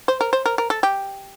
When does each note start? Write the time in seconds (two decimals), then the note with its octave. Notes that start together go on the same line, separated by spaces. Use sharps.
0.08 C5
0.21 A#4
0.33 C5
0.46 A#4
0.58 A#4
0.70 A4
0.83 G4